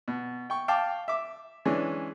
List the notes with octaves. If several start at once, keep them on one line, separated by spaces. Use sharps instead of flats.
B2
G5 C#6
F5 G5 A5 D6
E5 D6
E3 G#3 C#4 D4